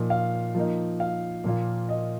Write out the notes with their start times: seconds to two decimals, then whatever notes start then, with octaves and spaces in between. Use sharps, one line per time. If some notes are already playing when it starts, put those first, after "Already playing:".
Already playing: A#2 F3 D#4
0.10 F5
0.55 F3 A#3 D#4
1.00 F5
1.44 A#2 F3 A#3 F4
1.89 D#5